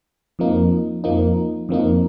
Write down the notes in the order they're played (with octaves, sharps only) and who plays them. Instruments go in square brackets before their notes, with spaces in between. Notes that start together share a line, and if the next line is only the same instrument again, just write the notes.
[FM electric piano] F2 F3 A#3 D#4
F2 F3 A#3 D#4
F2 F3 A#3 D#4